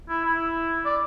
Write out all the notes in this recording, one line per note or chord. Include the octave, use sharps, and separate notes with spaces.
E4
E4
D5